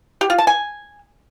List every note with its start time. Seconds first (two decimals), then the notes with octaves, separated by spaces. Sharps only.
0.21 G4
0.30 F4
0.38 A5
0.47 G#5